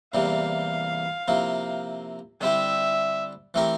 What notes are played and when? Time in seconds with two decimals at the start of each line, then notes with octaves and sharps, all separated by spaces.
0.14 E2 C3 E3 G3 A#3 F5
1.28 C3 F3 A#3 E4
2.41 D3 G3 C4 E4 G4 E5
3.54 E3 A3 C4 G4 A#4